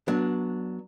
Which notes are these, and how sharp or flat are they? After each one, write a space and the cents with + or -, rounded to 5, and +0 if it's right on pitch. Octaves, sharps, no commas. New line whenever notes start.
F#3 +0 B3 -30 D4 +0